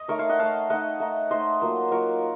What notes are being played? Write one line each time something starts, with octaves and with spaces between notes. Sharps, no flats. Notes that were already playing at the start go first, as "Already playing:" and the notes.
Already playing: D#5
A3 D#4 A#4 C#5
C#5 F5
D#5 F#5
A3 D#4 F5 A5
A3 D#4 D#5 F#5
A3 D#4
A3 D#4 C5 D#5
F#3 A#3 F4
F#3 A#3 F4 A#4 C#5